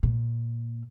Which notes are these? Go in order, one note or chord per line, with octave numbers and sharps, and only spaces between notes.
A#2